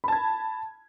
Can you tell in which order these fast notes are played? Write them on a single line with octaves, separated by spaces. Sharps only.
B5 A5 G#6